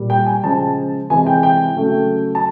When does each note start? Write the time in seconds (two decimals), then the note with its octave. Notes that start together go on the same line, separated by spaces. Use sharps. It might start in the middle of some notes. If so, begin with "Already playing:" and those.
Already playing: A#2 G3
0.10 G5
0.26 G#5
0.43 C#3 F3 G#3 A5
1.10 C3 E3 G#3 G#5
1.27 G5
1.43 G5
1.77 C#3 F#3 A3
2.35 A5